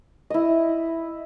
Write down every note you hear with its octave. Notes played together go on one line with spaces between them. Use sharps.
E4 D#5